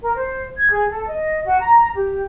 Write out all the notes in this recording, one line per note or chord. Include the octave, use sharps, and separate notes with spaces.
A#4
C5
G#6
G#4
A4
D#5
F#4
A#5
G4